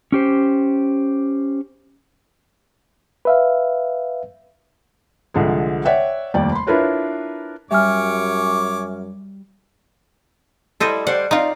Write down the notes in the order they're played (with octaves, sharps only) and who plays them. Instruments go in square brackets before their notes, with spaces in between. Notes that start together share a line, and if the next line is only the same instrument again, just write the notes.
[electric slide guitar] C#4 G4 C5
[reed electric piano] B4 E5 F5
[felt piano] C2 D3 F3 G#3
C#5 D5 E5 F#5 G5
F1 D#2 G3 D5 G5
B5 C6
D4 E4 F4 A#4 B4 C#5
[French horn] F#2 [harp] G3 [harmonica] C#5 D6 [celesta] E5 G#5 F6
[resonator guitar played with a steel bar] G3 E4 [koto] A4 C5 D#5
[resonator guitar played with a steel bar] G3 C5 D5 [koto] F#5
[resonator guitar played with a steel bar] C4 D5 F5 [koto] D#4 F4